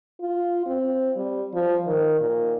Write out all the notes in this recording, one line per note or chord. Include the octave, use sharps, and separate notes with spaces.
F4
C4
G3
F3
D#3
A#2